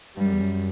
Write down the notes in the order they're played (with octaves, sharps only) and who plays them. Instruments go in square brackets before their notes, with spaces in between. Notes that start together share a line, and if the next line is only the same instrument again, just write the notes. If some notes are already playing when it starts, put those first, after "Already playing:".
[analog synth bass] G2 [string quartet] G3
[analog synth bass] F#2
E2
F#2